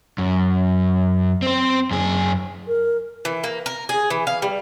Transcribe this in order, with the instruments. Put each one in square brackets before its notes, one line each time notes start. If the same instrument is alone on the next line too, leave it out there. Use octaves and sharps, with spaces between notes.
[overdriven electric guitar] F#2
C4 C5
F#2 G#4
[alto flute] A#4
[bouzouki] E3
A#3
A#4
G#4
E3
F5
G3